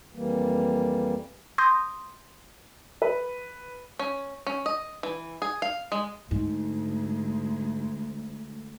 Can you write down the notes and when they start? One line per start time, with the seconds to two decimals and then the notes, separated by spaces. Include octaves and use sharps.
0.14 F2 E3 G3 A#3
1.58 C6 D#6 G6 A#6
3.02 B4
3.99 C#4
4.47 C#4
4.66 D#5
5.03 E3
5.42 G#4
5.62 F5
5.92 G#3
6.31 D2 G#2 G#3